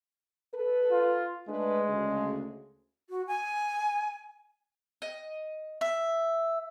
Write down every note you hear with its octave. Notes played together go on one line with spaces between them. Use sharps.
A4 B4
F4
G#3 A3 D4 B4
D2 C#3 G#4
F#4
G#5
D#5
E5